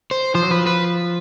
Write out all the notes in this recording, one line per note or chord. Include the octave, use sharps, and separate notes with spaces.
C5
F3 C5
F#3
F3 B4
B4